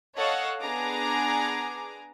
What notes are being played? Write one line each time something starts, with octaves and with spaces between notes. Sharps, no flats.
A4 C#5 D#5 F5 F#5 A5
B3 D4 G#4 G#5 A#5 D6